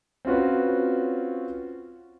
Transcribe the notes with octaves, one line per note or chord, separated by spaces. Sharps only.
C4 C#4 F4 F#4 B4